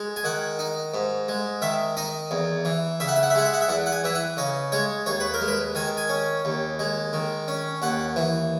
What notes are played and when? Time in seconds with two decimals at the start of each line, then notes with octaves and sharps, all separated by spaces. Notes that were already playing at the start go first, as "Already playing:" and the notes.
Already playing: G#3
0.16 G#5
0.24 D#3 F#5
0.59 D#4
0.94 G#2
1.28 G#3
1.62 D#3 E5
1.97 D#4 D#5
2.31 E2
2.65 E3
3.00 C#3 E5
3.08 F#5
3.16 E5
3.23 F#5
3.30 E5
3.35 G#3 F#5
3.45 E5
3.53 F#5
3.61 E5
3.68 E2 F#5
3.86 F#5
3.92 G#5
4.04 E3 E5
4.15 F#5
4.37 C#3 D#5
4.72 G#3 C#5
5.06 D#2 C#5
5.20 B4
5.34 A#4
5.41 G#3
5.48 B4
5.75 D#3 G#5
5.97 G#5
6.09 C#4
6.45 D#2
6.79 G#3
7.13 D#3
7.48 C#4
7.82 D#2 F#5
8.16 E3